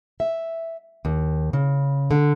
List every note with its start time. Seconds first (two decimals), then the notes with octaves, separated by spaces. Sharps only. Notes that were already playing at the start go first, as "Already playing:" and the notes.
0.20 E5
1.05 D#2
1.53 C#3
2.11 D3